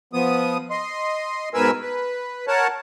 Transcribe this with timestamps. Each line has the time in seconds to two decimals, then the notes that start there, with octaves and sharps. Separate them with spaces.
0.13 F3 B3 D#6
0.70 D#5 C6
1.54 G#2 B2 A#4 B4 G#5 E6
1.82 B4
2.48 A#4 C#5 F#5 A5